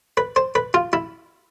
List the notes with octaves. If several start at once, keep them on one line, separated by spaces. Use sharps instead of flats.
B4
C5
B4
F4
E4